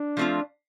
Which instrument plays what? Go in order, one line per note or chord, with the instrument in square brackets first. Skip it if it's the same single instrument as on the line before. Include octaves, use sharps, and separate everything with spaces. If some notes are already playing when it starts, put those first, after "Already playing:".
Already playing: [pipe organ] D4
[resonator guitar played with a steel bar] F3 A3 C4 F4